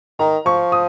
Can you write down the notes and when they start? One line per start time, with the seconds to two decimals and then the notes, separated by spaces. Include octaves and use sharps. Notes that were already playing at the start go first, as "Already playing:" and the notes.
0.19 D#3 A#5
0.46 F3 C#6
0.72 D#6